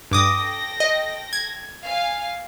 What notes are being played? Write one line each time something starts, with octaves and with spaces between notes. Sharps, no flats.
G2 A4 G5 D6 D#6 A#6
D#5
G#6
F5 G#5